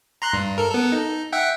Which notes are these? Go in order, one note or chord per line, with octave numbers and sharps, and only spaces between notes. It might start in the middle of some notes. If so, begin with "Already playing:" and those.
A#5 C6 F#6
G2
A4 A#4
B3 A4
D#4
E5 F#5 G5